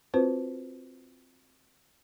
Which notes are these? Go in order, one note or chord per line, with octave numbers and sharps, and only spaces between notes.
C4 F4 F#4 B4 C5